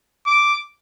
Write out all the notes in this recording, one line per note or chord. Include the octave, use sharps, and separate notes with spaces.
D6